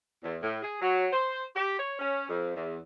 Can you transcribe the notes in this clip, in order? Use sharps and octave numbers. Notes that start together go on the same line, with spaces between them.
E2
A2
G#4
F#3
C5
G4
C#5
C#4
F2
E2